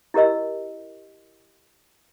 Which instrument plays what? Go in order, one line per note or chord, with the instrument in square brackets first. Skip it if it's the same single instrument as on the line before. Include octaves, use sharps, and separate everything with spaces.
[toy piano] E4 G4 A#4 D#5 E6